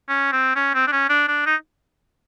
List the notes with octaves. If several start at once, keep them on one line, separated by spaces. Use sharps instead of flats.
C#4
C4
C#4
C4
D4
C#4
D4
D4
D#4